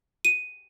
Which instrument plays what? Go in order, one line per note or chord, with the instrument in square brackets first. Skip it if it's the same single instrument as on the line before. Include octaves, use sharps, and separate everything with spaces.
[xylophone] D#7